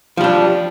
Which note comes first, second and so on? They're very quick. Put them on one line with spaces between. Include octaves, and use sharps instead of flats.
F3 G3 D4